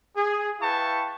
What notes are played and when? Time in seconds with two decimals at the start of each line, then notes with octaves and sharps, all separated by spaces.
0.16 G#4
0.61 E4 B4 F5 G5 A5 C#6